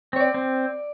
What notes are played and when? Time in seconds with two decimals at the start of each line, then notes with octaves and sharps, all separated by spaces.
0.13 C4 C#5
0.20 D5
0.34 C4